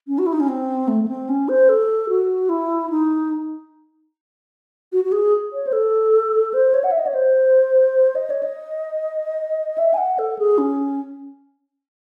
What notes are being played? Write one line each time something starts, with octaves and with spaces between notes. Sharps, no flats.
C#4
F#4
E4
D#4
C#4
C4
A3
A3
C4
C#4
C5
A4
F#4
E4
D#4
F#4
F#4
G#4
C#5
C5
A4
C5
C#5
F#5
E5
D#5
C#5
C5
D#5
C#5
D#5
E5
G#5
F#5
A4
G#4
C#4